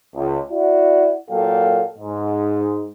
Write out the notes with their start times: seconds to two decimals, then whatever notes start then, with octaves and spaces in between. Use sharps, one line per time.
0.15 C#2
0.50 E4 F#4 D5
1.31 A#2 F#3 A#3 A4 F5 G5
1.98 G#2